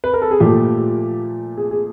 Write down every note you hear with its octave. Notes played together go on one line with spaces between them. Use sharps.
B4
A#4
A4
G#4
A#2 F3 A3 G4
G#4
G#4